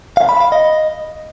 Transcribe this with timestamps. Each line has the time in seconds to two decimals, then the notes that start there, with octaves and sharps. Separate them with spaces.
0.17 F5
0.29 B5
0.40 F5
0.52 D#5